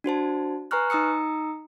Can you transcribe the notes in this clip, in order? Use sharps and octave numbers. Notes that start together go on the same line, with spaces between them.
D4 F#4 C5 A5
B4 G#5 A#5 C#6 F6 F#6
D#4 A#5 D#6 E6 C#7